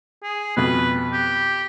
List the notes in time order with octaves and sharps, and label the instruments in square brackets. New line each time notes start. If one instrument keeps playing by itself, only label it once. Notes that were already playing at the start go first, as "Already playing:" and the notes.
[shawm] G#4
[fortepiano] F2 B2 [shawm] B4
[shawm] G4